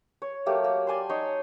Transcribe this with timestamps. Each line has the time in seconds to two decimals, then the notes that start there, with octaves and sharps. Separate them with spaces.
0.22 C#5
0.46 F#3 A3 A#3 G4
0.64 A#3
0.87 D5 G#5 A5 C6
1.09 D#4 C#5 C6